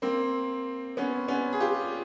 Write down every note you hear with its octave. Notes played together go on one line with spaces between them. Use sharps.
A#3 C4
B3 C#4
B3 C#4
G#4
F4 G4